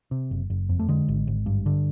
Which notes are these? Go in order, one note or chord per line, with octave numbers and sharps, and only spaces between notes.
C3
F#1
F#1
F2
A3
D3 G#3
G#1
G#1
G2
D3